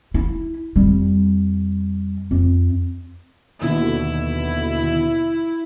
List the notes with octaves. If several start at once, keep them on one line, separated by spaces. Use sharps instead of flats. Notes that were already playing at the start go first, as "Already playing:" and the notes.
E4
F2 G3
F2
D#2 B2 D3 E4